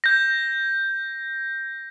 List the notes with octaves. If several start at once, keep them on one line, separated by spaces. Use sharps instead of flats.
G6 A#6